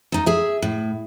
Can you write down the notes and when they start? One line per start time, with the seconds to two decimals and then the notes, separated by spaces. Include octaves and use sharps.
0.12 E2 D#4
0.26 G#4 E5
0.62 A2